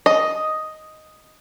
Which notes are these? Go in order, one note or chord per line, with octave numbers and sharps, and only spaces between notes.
D#5